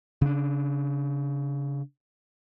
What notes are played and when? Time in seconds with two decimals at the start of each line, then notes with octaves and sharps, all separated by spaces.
0.21 C#3 D4